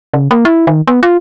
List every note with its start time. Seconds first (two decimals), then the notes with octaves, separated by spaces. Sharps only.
0.14 C#3
0.31 A#3
0.45 E4
0.67 D#3
0.87 B3
1.03 F4